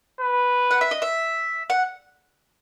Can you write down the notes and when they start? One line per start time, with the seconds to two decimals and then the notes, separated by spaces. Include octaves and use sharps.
0.21 B4
0.71 F#5
0.81 E5
0.91 D#5
1.02 E5
1.70 F#5